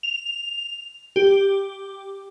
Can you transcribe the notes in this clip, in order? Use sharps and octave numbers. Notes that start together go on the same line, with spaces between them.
F7
G4